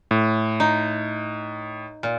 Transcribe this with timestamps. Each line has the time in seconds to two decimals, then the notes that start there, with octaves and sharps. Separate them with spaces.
0.11 A2
0.60 D#4
2.03 A#2